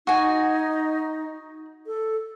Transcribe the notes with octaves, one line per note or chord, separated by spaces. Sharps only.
D#4 F#4 G#5
A4